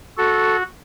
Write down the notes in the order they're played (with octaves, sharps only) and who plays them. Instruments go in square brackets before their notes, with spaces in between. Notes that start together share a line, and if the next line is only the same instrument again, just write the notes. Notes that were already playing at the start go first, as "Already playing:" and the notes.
[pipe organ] F#4 A4